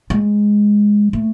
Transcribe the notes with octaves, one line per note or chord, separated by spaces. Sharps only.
G#3
A3